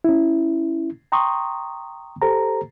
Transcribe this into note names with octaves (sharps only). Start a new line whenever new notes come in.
C#4 E4
G5 A#5 C6 C#6 D#6
G4 A4 C5 A#5